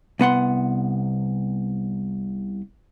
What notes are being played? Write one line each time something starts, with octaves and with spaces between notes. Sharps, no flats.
C2 B3 F#5 C6